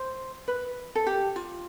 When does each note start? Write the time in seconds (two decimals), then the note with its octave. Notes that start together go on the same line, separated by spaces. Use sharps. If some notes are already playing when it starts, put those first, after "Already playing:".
Already playing: C5
0.48 B4
0.95 A4
1.07 G4
1.36 F4